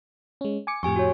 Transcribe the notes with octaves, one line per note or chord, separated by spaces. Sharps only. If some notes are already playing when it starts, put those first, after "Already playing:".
G#3 C#4
G#5 D6 C#7
F2 A2 G4 G#5 C#6
F#4 C#5